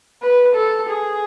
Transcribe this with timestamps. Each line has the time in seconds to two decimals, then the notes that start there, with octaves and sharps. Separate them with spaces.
0.22 B4
0.55 A4
0.89 G#4